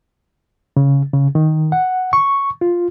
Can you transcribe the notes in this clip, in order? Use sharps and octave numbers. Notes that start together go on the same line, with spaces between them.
C#3
C#3
D#3
F#5
C#6
F4